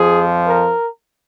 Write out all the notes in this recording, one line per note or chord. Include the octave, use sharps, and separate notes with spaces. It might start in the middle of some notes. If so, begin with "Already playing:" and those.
Already playing: F2 F3 G#4
A#4